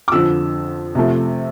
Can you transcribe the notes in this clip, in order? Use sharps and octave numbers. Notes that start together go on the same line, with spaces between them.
D6
F2 D3 F3 E6
C3 F3 A3